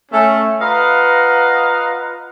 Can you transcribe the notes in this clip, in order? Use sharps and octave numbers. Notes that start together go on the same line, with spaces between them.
A3 C#4
F4 B4 D#5 F5 F#5 A#5